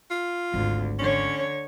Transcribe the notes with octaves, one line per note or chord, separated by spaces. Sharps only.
F4
G#1 D2
D3 C#4 C#5